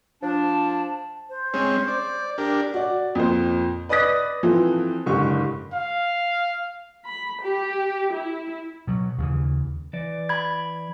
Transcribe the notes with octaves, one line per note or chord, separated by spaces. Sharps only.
F3 D4 A5
C5
G#3 C4 C#4
D5
D4 G4 A#4
F#4 D5
F2 A#2 C5
B4 D5 D#5 D#6 F#6 A#6
E3 F3 C4 F4 A4
F#1 G#2 D3 G4 C#6
F5
B5
G4
E4
B2 F#3
D#2 C#3 E3
E3 D5
B5 G#6